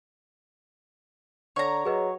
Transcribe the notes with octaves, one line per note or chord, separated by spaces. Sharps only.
D3 C#5 A#5
F#3 G#4 B4 D#5